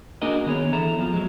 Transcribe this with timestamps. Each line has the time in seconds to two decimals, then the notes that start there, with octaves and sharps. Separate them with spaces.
0.22 A#3 D4 F#4 G#4 A#4 D#5
0.46 D#3 B3 G#4 C#5
0.73 E3 A4 E5 A#5
0.99 F2 F3
1.13 F#3 G#3